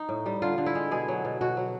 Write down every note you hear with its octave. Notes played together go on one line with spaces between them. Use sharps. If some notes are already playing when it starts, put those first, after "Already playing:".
Already playing: D#4
A2
G3
D3 F4
D3
E4
G#3
B2 G#4
F#3
B2
B2 F#4
F#3